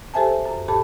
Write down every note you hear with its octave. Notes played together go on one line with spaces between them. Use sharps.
G4 A4 C5 E5 G#5 A5
F#2
A#2 G4 A4 A5 B5